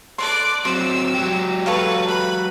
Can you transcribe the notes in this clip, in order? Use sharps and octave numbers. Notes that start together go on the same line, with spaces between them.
A4 B4 D5 C6 D6
F#3 C4 C6 E6
F#3 G4
A4 B4 C#5 F5
B4 B5